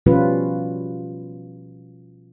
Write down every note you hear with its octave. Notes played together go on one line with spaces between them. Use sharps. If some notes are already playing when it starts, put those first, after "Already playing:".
B2 F3 G3 C#4 F4 B4